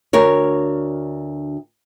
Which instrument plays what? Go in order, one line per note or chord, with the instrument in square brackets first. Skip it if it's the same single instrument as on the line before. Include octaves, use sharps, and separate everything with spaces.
[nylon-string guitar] D2 A#4 C#5